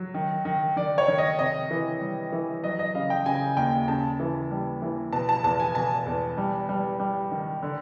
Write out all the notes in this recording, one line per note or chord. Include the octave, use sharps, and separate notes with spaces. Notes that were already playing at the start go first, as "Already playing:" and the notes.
Already playing: F#3
D#3
D#3
D#3 D5
C#5
D#3
D#5
C3 D#5
E3
G3
E3
F#3 D#5
D#5
C#3 F5
G5
C#3 G#5
D#2 G5
C#3 A5
E3
G3
E3
B2 A5
A5
E2 A5
G#5
B2 A5
E2
G3
G3
G3
D#3
D3